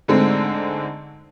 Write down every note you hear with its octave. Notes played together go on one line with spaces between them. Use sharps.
G#2 D3 G#3 A3 C4